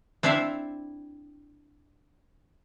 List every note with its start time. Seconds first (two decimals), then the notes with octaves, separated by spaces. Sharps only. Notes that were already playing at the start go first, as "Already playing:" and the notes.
0.23 C4 D4 E4 C5 E5 F5